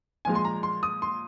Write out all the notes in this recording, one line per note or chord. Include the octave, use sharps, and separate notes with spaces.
A#2 F3 G#3 G#5
C6
A#5
C6
D#6
C6